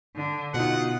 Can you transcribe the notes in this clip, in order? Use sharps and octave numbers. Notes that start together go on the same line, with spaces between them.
D3
B2 D#4 F4 F#5